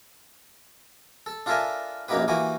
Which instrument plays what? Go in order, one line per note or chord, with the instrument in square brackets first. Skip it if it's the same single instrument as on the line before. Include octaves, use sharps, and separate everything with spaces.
[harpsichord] A4
D4 F4 A4 A#4 E5 G#5
A#1 F#2 A#3 D#4 G4 B4
E3 A#3 F#4 G4 G#5